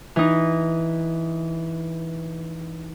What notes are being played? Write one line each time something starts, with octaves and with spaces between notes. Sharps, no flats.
E3 D#4